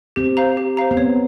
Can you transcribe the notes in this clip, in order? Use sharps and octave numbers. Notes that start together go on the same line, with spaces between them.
C4 G4
C5 F5 A#5
G4
C5 F5 A#5
B3
C4 C#5